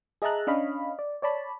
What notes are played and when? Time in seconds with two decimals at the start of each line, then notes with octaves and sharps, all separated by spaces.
0.22 G#4 D#5 E5 A5 A#5 F#6
0.47 C#4 D4 C#5 D#5 F5 B5
0.99 D5
1.22 C#5 D5 A5 B5